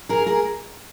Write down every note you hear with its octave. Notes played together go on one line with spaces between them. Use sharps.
G#4 A#4
G#4 A#4